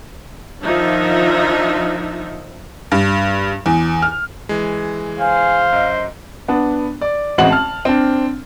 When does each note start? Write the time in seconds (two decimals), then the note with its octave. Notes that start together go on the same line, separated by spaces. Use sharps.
0.63 D#3 F3 D4 D#4 F4 E5
2.92 G2
3.66 E2
4.02 F6
4.49 E3 G#3
5.19 C5 F5 G#5
5.73 F#2 D#5
6.48 B3 D4
7.01 D5
7.38 A1 G#3 C4 F#4 F#5 F#7
7.50 A5 F6
7.85 C4 D4